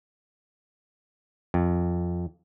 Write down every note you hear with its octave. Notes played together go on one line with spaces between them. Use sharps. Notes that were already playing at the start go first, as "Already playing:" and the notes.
F2